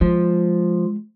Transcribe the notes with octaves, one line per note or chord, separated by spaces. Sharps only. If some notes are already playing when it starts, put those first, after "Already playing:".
F3 G#3